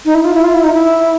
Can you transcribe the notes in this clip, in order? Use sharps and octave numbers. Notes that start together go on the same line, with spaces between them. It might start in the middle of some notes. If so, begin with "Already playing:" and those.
D#4
E4
F4
E4
F4
E4
D#4
E4